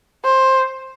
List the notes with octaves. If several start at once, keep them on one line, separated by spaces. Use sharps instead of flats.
C5